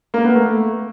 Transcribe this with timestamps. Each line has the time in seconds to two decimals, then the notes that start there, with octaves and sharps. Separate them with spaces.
0.14 A#3
0.24 B3
0.34 A3